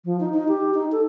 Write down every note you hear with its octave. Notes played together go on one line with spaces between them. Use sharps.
F3
D#4
D#4
G4
D#4
A4